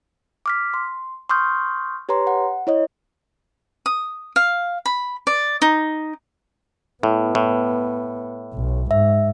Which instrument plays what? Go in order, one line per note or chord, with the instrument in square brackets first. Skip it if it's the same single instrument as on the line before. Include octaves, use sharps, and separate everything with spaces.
[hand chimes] D6 F6 B6
C6
C6 C#6 D#6 F6 G6
G4 B4 C#5 A#5 C6
F#5
E4 C#5 D#5
[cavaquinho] D#6
F5
B5
D5
D#4
[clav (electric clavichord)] A2 [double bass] B3
[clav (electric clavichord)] A2
[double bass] B1
[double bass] G#2 [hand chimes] E5